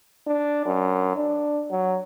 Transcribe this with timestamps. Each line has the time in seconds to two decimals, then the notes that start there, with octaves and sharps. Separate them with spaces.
0.27 D4
0.65 F#2
1.16 D4
1.71 F#3